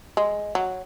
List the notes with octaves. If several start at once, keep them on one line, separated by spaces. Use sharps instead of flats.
G#3
F#3